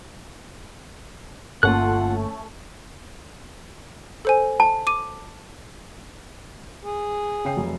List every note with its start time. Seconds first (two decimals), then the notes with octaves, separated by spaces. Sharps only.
1.63 G1 G2 A3 A#3 C#4 F4 F#5 F#6
4.25 A4 C5 G#5
4.60 A5
4.87 D6 D#7
6.84 G#4
7.45 C#3 G5 C7
7.57 F1 F#3